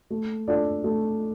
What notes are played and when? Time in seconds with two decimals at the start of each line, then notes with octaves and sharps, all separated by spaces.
0.10 A3
0.48 D4 F4 A4 D5
0.84 A3